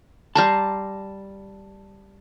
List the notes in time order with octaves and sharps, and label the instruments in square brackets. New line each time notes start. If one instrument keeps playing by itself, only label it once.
[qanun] G3 A#5 C6 [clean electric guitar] A5